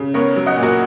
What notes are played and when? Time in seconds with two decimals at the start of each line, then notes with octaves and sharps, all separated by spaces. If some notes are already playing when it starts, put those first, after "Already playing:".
Already playing: C#3
0.14 B3 A#4 C#5
0.36 F#3
0.46 D#5 F#5
0.57 A#2
0.63 F#4 A#4